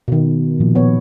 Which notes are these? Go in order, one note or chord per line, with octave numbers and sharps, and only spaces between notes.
B2 D#3
A#2 F3
B3 C#5